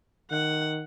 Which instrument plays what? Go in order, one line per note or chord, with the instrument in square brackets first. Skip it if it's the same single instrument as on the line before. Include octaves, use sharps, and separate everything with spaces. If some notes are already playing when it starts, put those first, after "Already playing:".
[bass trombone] D#3 [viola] F#5